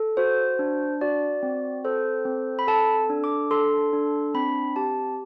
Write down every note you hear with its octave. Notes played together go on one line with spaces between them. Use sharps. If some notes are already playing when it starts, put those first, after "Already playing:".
Already playing: A4
F#4 C5
D4
F#4 D5
C4
A4 C5
C4
B5
A4 A5
D4
D6
A4 C6
D4
C4 B5
G4 A5